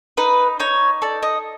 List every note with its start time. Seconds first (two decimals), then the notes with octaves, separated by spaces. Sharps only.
0.17 D#4 B4
0.60 D#4 C#5
1.02 A4 D5
1.22 D#5